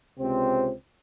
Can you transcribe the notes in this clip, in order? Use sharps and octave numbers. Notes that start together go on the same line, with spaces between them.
C#2 C3 C4